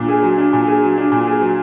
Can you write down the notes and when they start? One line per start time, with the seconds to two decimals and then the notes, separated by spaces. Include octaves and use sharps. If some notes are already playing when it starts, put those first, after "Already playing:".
Already playing: A#2 D4
0.08 G#4
0.23 F#3
0.38 D4
0.53 A#2
0.67 G#4
0.83 F#3
0.98 D4
1.12 A#2
1.27 G#4
1.42 F#3